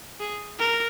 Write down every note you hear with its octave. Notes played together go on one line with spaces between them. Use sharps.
G#4
A#4